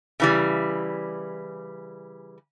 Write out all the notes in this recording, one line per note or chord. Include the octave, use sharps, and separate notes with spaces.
C#3 E3 G3